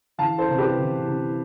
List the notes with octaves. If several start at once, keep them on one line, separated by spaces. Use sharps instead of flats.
E3 F5 A5
A4 C5
C3
G4 B4
E3
C3